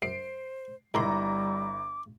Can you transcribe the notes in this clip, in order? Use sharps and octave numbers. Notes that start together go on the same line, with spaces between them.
F#2 C5 C7 D7
G1 C#2 D#3 G3 E4 A#5 C6 D6